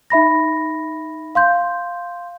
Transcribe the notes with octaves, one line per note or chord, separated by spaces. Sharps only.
D#4 E5 B5 A#6
F5 C6 G6